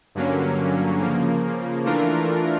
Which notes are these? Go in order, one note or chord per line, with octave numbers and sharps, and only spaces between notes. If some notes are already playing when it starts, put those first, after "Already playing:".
G2 D3 F#3 A#3 C#4
C#3 F3 A#3
E3 A3 D4 F4 A#4